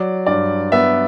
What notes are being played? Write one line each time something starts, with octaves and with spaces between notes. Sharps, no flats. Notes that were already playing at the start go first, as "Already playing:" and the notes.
Already playing: F#3 D5
G2 D5
B3 E5